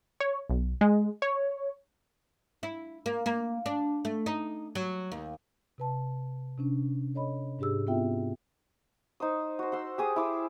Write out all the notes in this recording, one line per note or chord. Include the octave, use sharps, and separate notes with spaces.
C#5
B1
G#3
C#5
E4
A#3
A#3
D4
A3
D#4
F#3
D#2
C3 B4 A5
C3 C#4 D4
A4 C#5 D#5 B5
G#2 D4 G4 G#4 E6
B3 C4 E4 F4 E5 G5
D#4 C5 D#6
F#4 C5
F#5 C6 E6
G4 G#4 D#6
E4 D6 E6